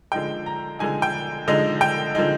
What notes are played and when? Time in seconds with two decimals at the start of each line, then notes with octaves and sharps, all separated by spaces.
0.12 D3 F3 G#3 D#4 G5
0.46 A#5
0.79 D3 F3 G#3 D#4 G#5
1.02 G5
1.48 D3 F3 G#3 D#4 D#5
1.81 G5
2.15 D3 F3 G#3 D#4